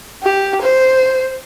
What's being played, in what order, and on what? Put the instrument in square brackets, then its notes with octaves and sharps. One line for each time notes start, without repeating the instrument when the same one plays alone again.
[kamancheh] G4
C5